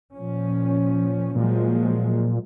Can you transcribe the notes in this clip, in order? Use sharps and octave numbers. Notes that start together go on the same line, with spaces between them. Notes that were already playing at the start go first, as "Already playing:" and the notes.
A#2 F3 C#4
A#2 F3 F#3 G#3